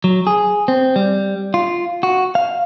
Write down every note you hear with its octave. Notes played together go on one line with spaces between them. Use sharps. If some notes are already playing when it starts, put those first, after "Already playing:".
F#3
G#4
C4
G3
F4
F#4
F5